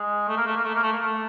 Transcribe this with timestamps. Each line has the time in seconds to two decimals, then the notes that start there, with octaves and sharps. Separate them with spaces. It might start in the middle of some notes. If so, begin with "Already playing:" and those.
Already playing: G#3
0.28 A3
0.37 A#3
0.46 A3
0.56 A#3
0.65 A3
0.74 A#3
0.83 A3
0.92 A#3
1.01 A3